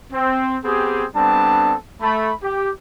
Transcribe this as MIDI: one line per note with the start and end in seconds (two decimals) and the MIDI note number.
0.13 0.57 60
0.64 1.06 59
0.64 1.06 60
0.64 1.06 67
0.64 1.06 68
1.15 1.75 55
1.15 1.75 59
1.15 1.75 60
1.15 1.75 62
1.15 1.75 69
1.15 1.75 81
2.02 2.32 57
2.02 2.32 83
2.43 2.71 67